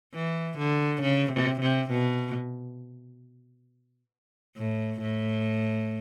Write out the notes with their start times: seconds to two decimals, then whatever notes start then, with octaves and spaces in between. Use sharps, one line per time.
0.14 E3
0.58 D3
1.03 C#3
1.33 C3
1.62 C3
1.92 B2
4.57 A2
5.01 A2